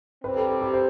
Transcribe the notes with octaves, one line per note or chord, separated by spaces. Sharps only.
C3 G3 C4 B4
A4
A4
G4
C5